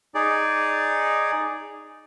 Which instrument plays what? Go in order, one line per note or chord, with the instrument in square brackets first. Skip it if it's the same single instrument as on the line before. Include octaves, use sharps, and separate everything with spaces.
[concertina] D#4 G#4 D5